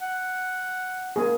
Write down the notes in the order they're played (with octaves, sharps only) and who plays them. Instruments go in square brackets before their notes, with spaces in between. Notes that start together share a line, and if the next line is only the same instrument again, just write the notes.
[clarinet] F#5
[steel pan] A#3 G#4